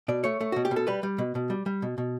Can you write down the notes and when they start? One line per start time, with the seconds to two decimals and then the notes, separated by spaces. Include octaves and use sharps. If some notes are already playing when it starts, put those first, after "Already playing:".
0.08 B2 D5
0.24 A3 C#5
0.41 A3
0.52 B2 F#4
0.65 G4
0.71 B2
0.76 A4
0.87 G3 B4
1.03 G3
1.18 B2
1.35 B2
1.50 G3
1.66 G3
1.82 B2
1.98 B2